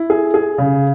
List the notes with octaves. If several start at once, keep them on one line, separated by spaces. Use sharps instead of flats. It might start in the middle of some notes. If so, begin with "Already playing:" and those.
Already playing: E4
G#4
G#4
C#3